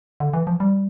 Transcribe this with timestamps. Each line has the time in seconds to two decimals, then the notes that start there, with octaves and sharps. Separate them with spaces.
0.20 D3
0.34 E3
0.47 F3
0.60 G3